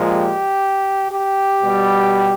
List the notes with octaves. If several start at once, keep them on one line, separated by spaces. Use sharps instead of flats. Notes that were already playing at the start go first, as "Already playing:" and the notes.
Already playing: A#2 F3 G#3
G4
G4
B2 G3